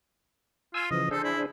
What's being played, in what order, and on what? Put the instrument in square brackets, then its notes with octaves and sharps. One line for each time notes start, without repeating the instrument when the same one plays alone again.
[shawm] F4 [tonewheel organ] G#5 E6
[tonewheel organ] C#3 E3 F3 [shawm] D#5
[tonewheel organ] D4 G#4 C5 [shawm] A4
[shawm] E4